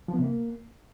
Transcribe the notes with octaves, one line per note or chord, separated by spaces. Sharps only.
F3
B3
C3
A#3